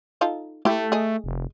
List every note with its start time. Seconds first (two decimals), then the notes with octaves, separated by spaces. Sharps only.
0.21 D#4 F4 A4
0.65 A3 E4 G4
0.92 G#4 D#5
1.24 F1